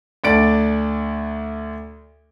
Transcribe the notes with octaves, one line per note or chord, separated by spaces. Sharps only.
D2 D4 D5 D7